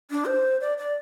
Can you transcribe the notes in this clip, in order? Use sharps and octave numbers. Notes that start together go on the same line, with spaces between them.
D4
C5
D5
D5